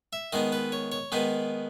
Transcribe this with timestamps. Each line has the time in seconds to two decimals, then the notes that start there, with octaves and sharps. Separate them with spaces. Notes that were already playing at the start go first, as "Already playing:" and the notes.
0.13 E5
0.32 D#3 G#3 B3 D#4 D#5
0.52 B4
0.72 C#5
0.92 C#5
1.12 D#3 G#3 B3 D#4 B4